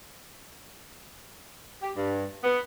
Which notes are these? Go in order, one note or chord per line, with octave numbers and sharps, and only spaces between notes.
G4
G2
B3